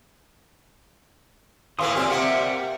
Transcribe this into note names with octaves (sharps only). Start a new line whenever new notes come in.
A2 E3 A#3 F5 C6 D#6
A#2 G3 C4 G4 C6 F6
C3 G3 A#3 E5 F#5 F6